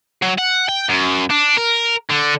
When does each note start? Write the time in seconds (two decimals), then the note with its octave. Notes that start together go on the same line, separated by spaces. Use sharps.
0.22 F#3
0.38 F#5
0.69 G5
0.89 F#2
1.30 D4
1.57 A#4
2.11 D3